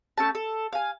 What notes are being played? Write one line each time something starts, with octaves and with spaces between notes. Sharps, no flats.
A3 C#4 G5 A5
A4
F5 G#5